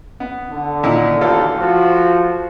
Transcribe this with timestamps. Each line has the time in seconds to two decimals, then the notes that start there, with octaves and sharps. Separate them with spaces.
0.20 B3
0.50 D3
0.83 A#2 D#3 E4
1.21 A1 D2 F4 A4
1.58 F3 F#4